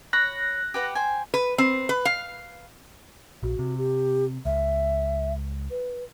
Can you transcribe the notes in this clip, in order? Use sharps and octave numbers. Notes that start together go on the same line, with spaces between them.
C#5 B5 F#6 A#6
G4 B4 F#5
C5 G5 G#5
B4
C4
B4
F5
A#1 F#4
C3
G4
C#2 E5
B4